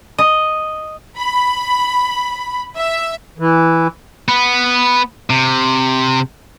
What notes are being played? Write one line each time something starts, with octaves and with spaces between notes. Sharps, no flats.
D#5
B5
E5
E3
B3
C3